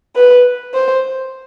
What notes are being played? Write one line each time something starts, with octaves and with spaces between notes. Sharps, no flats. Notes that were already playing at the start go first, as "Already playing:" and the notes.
B4
C5